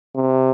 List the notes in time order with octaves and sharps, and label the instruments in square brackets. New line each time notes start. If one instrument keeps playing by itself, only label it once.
[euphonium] C3